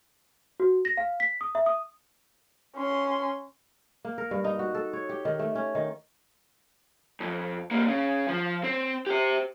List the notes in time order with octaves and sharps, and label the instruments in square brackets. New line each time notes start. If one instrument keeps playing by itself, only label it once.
[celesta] F#4
A#6
F5
B6
D#6
E5
D#6
[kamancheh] C#4 C6
[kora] A#3
A#4
G2
D#4
F#4
A4
C#5
G4
D#3
A3
C#4
D#3
[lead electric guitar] F2
C2 A#3
C#3
F3
C4
G4 C5